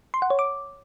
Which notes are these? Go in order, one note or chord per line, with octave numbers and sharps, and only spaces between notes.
C6
F#5
C#5
D6